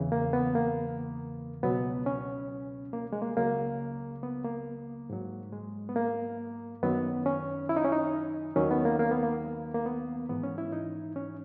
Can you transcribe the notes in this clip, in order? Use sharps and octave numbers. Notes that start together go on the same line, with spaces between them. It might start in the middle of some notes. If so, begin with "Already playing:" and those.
Already playing: E2 C#3 E3
A#3
B3
A#3
C#2 B2 F#3 B3
C#4
A#3
G#3
A#3
C#2 C#3 F#3 A#3
B3
A#3
G#2 F#3
G#3
B3
A#3
F#2 D#3 F#3 B3
C#4
E4
D#4
C#4
D#4
D#2 D#3 F#3 C#4
B3
A#3
A#3
B3
A#3
A#3
B3
G#2 E3 B3
C#4
E4
D#4
C#4